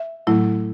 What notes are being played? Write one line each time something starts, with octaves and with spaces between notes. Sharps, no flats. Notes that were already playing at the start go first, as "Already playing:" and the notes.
Already playing: E5
A2 F#3 A3 E4